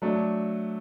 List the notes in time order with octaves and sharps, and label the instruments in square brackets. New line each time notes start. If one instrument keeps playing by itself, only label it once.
[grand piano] F#3 A3 D4